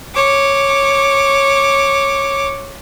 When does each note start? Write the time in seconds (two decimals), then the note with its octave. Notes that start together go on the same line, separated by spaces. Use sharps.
0.14 C#5 D6